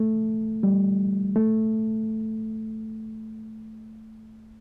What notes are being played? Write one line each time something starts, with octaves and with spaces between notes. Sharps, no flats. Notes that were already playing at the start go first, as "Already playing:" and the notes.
Already playing: A3
G3
A3